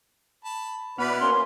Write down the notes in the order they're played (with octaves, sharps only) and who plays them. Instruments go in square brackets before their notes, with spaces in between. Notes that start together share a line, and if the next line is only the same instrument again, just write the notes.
[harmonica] A5 B5
[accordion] B2 B4 B5 [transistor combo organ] B3 F#5 F6 [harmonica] E4 D5
[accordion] A#3 C#4 [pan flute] C6